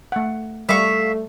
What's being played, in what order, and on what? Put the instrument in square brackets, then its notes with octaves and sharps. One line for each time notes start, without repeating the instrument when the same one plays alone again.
[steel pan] A3 F#5
[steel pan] G3 D5 [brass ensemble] A3 [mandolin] E5 F5 C#6